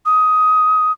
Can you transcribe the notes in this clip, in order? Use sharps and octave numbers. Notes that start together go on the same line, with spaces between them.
D#6